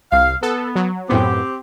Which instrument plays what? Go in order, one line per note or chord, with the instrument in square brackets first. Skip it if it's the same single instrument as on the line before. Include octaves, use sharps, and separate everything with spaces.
[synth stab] C2 [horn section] F5
[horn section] B3 [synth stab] A4
[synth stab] F#3
[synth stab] F#2 A2 B3 [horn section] C4 G4